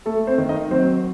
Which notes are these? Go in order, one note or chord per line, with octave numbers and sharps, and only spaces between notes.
A3 A4
C4 C5
D#3
D#4 D#5
F#3 C4 C5